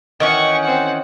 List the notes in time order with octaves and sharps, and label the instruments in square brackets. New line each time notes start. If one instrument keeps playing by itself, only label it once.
[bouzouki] D#3 E3 C#4 [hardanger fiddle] F#5 C#6
[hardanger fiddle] C4 F#5